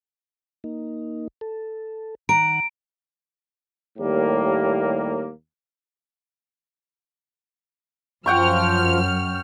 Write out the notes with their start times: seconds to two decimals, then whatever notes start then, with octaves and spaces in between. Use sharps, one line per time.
0.64 A#3 D#4
1.41 A4
2.29 D#3 F#5 A#5 D7
3.98 D#2 A2 G3 A#3
8.26 F#2 F3 F#5 G5 C#6 F6